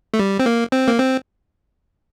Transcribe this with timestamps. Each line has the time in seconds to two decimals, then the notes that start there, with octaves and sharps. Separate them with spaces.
0.14 A3
0.19 G3
0.40 C4
0.46 A#3
0.72 C4
0.88 A#3
0.98 C4